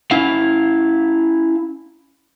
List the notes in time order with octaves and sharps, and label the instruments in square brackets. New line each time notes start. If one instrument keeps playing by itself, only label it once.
[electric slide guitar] C#4 E4 F5